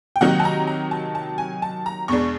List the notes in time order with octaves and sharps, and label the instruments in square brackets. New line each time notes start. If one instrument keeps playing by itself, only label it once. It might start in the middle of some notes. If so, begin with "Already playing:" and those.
[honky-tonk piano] G5
C3 D#3 F#3 A#3 D#4 F#5
A5
A#5
A#5
A5
A5
G#5
A5
A#5
E2 B2 G#3 B3 D4 C#6